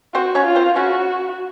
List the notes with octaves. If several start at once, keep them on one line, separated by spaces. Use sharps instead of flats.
C4 F#4 C5
C#4 C#5
F4
C4 C5
C#3 C#4 F#4